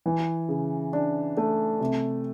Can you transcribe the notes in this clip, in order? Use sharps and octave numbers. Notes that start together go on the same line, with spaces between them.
E3
C#3
D4
A3
C3